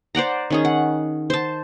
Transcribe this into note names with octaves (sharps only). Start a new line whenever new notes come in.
C5 D5 F#5 A#5
D#3 C#4 G#4
F#5
C5 A5